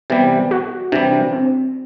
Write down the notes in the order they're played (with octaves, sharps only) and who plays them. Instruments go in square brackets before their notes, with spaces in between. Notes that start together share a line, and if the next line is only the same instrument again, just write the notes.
[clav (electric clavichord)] C3 E3 G3 [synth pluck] B3
[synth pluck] F#4
[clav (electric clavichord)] C3 E3 G3 [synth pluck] D4
[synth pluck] C4